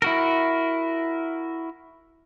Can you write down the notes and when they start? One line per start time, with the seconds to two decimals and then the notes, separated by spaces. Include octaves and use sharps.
0.02 E4 F#4 A#4